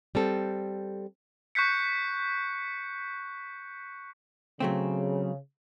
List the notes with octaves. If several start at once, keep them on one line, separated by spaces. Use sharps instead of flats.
G3 C4 A4
C#6 F#6 G6 B6 C#7
C#3 F#3 A3 C4